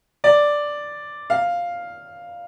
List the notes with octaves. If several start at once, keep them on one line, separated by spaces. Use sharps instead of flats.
D5
F5